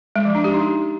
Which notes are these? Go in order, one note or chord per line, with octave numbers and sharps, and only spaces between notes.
G#3
F3
D4
G4
D#4